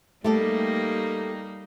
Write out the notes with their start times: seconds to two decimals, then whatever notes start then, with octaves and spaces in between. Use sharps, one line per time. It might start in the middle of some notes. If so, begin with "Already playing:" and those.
0.24 G3 A3 A#3 D#4 G4 A4